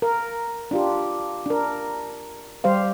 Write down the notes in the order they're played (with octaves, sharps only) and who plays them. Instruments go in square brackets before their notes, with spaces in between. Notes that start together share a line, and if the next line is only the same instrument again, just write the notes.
[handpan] A#4
D4 F4 G4
D4 A#4
G3 G4 C5 F5